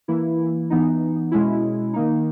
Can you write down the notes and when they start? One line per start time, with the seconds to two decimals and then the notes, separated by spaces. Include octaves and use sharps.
0.08 E3 A#3 E4
0.70 E3 B3 D#4
1.31 B2 G#3 C#4 E4
1.93 D#3 A#3 D#4